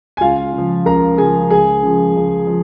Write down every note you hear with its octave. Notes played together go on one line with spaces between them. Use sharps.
G#5
C#2 F4 F5
C#3 F3
C#2 A#4 A#5
C#3 F3 G#4 G#5
C#2 G#4 G#5
C#3 F3
C#2
F3